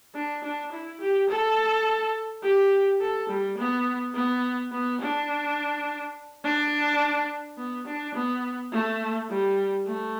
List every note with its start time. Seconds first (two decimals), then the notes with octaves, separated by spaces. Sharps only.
0.15 D4
0.43 D4
0.72 E4
1.00 G4
1.29 A4
2.43 G4
3.01 A4
3.29 G3
3.58 B3
4.15 B3
4.72 B3
5.01 D4
6.44 D4
7.58 B3
7.86 D4
8.14 B3
8.72 A3
9.30 G3
9.86 A3